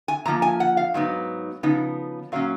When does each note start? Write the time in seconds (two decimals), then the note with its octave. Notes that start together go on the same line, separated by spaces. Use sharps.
0.08 G#5
0.25 A#2 F3 A#3 A#5
0.42 G#5
0.60 F#5
0.77 F5
0.94 G#2 F#3 B3 D#4
1.63 C#3 F3 B3 D#4
2.32 A#2 F#3 A#3 C#4 F5